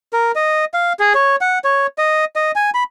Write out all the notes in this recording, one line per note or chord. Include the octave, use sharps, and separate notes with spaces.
A#4
D#5
F5
G#4
C#5
F#5
C#5
D#5
D#5
G#5
B5